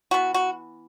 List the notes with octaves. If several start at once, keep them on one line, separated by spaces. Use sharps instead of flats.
E3 B3 F#4
F#4